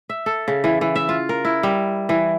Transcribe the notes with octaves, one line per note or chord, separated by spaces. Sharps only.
E5
A4
C#3
E3
E3
E5
F4
A#4
E4
G3
E3